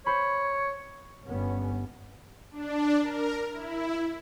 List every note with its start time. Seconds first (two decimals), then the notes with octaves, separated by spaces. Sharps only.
0.06 C5 C#5 B5
1.27 G1 G2 G3 B3 C#4
2.52 D4
3.02 A#4
3.50 E4